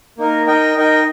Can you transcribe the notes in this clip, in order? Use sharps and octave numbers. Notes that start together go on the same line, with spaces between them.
A#3 D#4 A#4
D#4 A#4 D#5 G5
D#4 A#4 D#5 G5